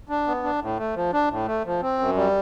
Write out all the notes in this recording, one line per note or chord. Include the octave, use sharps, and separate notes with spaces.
D4
B3
D4
A2
A3
F3
D4
A2
A3
F3
C4
F#2
G3